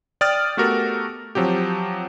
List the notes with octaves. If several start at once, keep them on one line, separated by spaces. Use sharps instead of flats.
D5 G5 D#6 F6 A6
A3 B3 F#4 G4 A4 A#4
F3 F#3 C4 G4